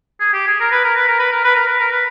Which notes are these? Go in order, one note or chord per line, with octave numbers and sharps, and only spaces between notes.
G#4
G4
G#4
A#4
B4
A#4
B4
A#4
B4
A#4
B4
A#4
B4
A#4
B4